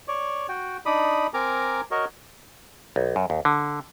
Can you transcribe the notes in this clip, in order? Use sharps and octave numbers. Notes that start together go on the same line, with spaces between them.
C#5 D5
F#4 G5
D4 D#4 D5 B5 D#6
C4 A#4 G#5 A#5 D6
F#4 A#4 C#5 D#5
B1
F#2
D#2
D3